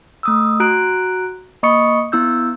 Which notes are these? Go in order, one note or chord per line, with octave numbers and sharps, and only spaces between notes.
A3 D#6 E6
F#4 A#5 F#6 D7
A#3 D#5 B5 C#6 D#6 C#7
B3 E4 E6 G6